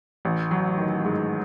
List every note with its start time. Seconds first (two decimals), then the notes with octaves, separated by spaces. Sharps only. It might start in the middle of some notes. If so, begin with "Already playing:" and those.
0.25 A1
0.51 F#3
0.78 D#3
1.05 G#2